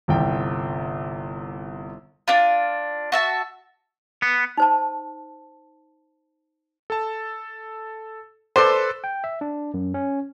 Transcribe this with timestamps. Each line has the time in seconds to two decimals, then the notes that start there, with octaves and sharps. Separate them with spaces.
0.08 G1 C2 G5
2.28 D4 F4
3.12 F#4 E5 A5
4.22 B3
4.57 D#4 C5 A5
6.90 A4 A5
8.56 A4 B4 C5 D5 C6
9.04 G5
9.24 E5
9.41 D4
9.74 F#2
9.94 C#4